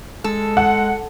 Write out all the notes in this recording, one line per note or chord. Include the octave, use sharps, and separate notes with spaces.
G#3 A4
F#5